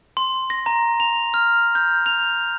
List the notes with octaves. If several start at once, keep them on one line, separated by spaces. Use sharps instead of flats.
C6
A#6
A#5
F7
F6
G6
F7